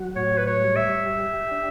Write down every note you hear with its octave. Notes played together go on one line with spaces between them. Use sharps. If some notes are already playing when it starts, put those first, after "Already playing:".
Already playing: F#3 F#4
A2 C#5
B4
C#5
G3
E5
G4
D4